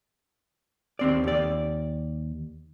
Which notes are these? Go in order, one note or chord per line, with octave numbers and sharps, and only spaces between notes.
D#2 C4 D5
D#2 D5